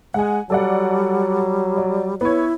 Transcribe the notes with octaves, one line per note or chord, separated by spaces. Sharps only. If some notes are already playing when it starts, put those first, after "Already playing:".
G#3 F#5 G#5
F#3 G3 A4 D5 F#5
D5
B3 E4 C#5